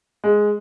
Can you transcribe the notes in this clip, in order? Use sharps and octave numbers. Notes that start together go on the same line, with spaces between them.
G#3